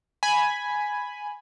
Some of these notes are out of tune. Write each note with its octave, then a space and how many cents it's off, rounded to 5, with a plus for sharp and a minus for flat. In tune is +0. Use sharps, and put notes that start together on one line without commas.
G#5 +0 B5 +0